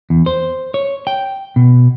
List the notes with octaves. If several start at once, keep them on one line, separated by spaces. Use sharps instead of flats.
E2
C5
C#5
G5
B2